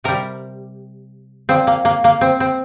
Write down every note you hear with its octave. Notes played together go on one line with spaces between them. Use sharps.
C3 G3 A#4
A#2 F3 C4
A#3
A#3
A#3
C4
C4